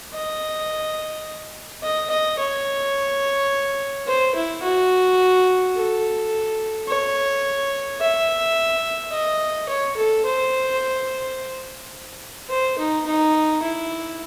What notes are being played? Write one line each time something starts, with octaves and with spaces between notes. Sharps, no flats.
D#5
D#5
D#5
C#5
C5
E4
F#4
A4
C#5
E5
D#5
C#5
A4
C5
C5
D#4
D#4
E4